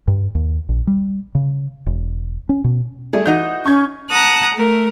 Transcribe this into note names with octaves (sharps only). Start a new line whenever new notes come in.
G2
D#2
A#1
G3
C#3
E1
C#4
B2
G3 A3 G#4
E3 D#4 F#4 D#5 G6
C#4 C#6 G6 G#6
F#5 A5 A#5 D#6 F#6
A3 A#4